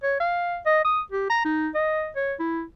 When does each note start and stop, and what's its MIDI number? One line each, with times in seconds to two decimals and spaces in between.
0.03 0.18 73
0.20 0.57 77
0.66 0.84 75
0.85 1.01 87
1.12 1.27 67
1.30 1.40 82
1.45 1.69 63
1.75 2.10 75
2.16 2.34 73
2.40 2.63 64